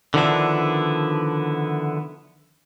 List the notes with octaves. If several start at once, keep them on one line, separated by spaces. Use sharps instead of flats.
D3 D#3 F3 B3 D4 E4